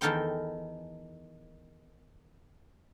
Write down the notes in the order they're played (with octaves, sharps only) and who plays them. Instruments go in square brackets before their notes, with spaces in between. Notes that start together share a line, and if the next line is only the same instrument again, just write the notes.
[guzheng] E2 D#3 A4 A#4 G5 C6